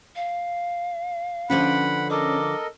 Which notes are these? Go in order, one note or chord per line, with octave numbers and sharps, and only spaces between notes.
F5
D3 F3 C#4 B4 F#5 B5
A4 A#4 D#5 D6